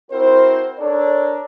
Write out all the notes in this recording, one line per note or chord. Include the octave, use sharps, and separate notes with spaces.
C4 E4 F#4 A#4 C5
D4 A4 A#4 C#5 D5